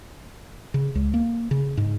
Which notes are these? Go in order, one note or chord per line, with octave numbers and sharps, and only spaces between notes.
C#3
C#2
A#3
C#3
G#2